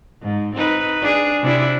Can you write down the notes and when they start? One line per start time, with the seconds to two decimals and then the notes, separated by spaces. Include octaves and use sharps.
0.22 G#2
0.56 C4 D#4 B4
1.01 D4 G#4
1.42 C3 D4 E4